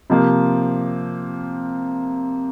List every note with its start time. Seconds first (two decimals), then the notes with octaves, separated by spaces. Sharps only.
0.10 C3 F3 A#3